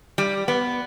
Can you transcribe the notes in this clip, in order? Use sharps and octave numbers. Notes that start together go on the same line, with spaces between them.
G3
B3